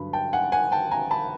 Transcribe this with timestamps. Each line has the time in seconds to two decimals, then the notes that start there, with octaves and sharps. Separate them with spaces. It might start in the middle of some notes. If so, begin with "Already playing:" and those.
Already playing: G2 D3 F#3 B5
0.13 G5 A5
0.33 F#5 G#5
0.52 F#5 G#5
0.72 G5 A5
0.91 G#5 A#5
1.11 A5 B5